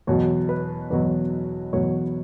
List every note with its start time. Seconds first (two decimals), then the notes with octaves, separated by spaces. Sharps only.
0.07 E2 B2 F#3 C#5
0.49 B4
0.90 E2 B2 F#3 B4
1.73 E2 B2 F#3 C#5